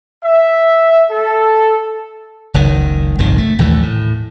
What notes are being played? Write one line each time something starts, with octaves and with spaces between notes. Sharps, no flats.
E5
A4
F#1 C#2 D#3
G1 C2 F2 D#3
A3
A#1 D#2 E3 A3
A2